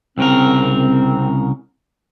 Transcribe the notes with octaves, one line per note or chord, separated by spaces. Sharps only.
C2 C#3 C4 A#4